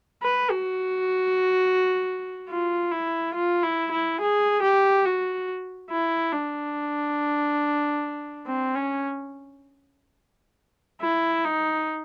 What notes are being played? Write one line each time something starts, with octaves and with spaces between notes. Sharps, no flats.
B4
F#4
F4
E4
F4
E4
E4
G#4
G4
F#4
E4
D4
C4
C#4
E4
D#4